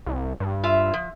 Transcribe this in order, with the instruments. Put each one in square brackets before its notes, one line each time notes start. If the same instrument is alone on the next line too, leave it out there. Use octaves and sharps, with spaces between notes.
[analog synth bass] C2
G2
[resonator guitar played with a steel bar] F4 E5
F3